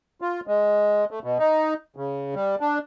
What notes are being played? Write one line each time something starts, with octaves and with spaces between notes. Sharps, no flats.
F4
G#3
A3
B2
D#4
C#3
G3
D4